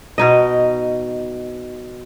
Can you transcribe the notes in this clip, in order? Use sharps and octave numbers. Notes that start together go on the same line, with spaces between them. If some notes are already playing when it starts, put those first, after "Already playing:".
B2 D#4 D#5